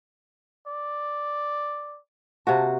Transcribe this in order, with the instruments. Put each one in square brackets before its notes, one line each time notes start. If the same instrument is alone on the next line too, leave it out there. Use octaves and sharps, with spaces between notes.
[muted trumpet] D5
[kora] C3 A#3 F#4 [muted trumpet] A5